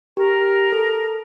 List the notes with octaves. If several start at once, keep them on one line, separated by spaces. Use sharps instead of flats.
G4 A#4
A4